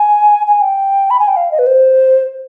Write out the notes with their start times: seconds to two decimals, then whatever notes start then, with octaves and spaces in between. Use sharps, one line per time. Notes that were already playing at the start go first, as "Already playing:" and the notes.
Already playing: G#5
0.47 G#5
0.61 G5
1.10 B5
1.19 G#5
1.28 G5
1.36 F5
1.51 D#5
1.59 B4
1.67 C5